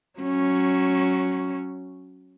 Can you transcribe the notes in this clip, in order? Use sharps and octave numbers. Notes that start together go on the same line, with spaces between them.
F#3 C#4